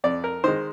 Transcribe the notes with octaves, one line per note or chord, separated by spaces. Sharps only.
F2 D5
A#4
D#3 G#3 C5